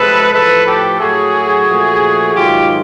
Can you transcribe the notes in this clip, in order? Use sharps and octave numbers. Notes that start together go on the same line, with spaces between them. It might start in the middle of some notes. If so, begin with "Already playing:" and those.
Already playing: C3 F3 G#3 A4 B4
A2 F3 A3 A4 B4
G4 A4
A2 F#3 A3 F#4 G#4
A#2 F3 A3
G#2 D#3 F#3 F4 G4